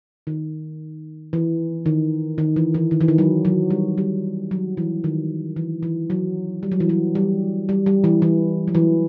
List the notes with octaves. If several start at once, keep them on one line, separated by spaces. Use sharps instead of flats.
D#3
E3
D#3
D#3
E3
E3
D#3
E3
D#3
F#3
F#3
G3
G3
F#3
E3
D#3
E3
E3
F#3
G3
F#3
E3
F#3
G3
G3
G3
E3
E3
F#3
E3